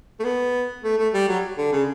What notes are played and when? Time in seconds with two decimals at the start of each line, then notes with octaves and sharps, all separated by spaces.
0.20 A3
0.24 B3
0.84 A3
0.98 A3
1.13 G3
1.28 F#3
1.58 D3
1.72 C#3